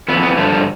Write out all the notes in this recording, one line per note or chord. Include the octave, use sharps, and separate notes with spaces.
F2 E3 B3
B3
G2 D3 F3 A3
G3